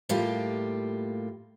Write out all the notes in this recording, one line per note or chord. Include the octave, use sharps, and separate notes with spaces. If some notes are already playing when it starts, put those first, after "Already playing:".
A2 G3 A#3 F4 G4